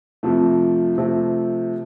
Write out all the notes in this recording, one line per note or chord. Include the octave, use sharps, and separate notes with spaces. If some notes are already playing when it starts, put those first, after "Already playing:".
F2 C3 F3 A3
C3 F3 A3 C4